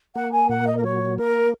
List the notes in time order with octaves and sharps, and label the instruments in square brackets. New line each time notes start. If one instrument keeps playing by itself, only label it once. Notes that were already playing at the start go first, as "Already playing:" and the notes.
[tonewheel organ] A#3 [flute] F#5
[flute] G#5
[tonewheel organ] A#2 [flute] F#5
[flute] D#5
A#4
[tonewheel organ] F#3 [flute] C#5
[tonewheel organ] A#3 [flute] A#4